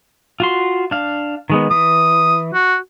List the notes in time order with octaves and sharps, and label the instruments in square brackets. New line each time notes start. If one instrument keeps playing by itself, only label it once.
[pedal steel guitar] F4 F#4 C6
D4 F5
D#3 G#3 B3
[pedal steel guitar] E3 [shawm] D#6
[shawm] F#4